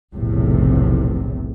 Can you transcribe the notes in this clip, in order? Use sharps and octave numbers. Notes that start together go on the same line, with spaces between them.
F1 B1 E2 A2 C3